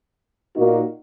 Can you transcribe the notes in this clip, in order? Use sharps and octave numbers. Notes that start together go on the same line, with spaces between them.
A#2 A#3 D#4 F#4